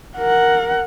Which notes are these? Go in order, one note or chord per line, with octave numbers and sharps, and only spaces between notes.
A#4 F#5